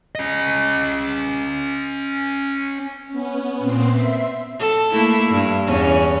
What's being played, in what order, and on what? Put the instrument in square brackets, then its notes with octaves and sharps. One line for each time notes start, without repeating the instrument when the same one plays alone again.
[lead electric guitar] C#4 D#5
[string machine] B3 C#4
A#2 B3 C4 C6
E5 C6
[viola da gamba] A4
A3 A#3 E4
G2
E2 C#4